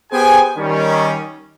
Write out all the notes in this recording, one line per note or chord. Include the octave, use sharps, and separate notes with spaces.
B3 G4 G#4 C5 G5 G#5
D#3 G3 C#4